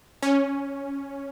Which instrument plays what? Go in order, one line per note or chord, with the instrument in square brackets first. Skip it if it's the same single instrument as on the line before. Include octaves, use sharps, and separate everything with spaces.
[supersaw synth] C#4